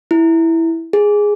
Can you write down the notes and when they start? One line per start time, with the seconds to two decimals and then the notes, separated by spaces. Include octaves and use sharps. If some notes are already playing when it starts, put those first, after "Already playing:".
0.11 E4
0.93 G#4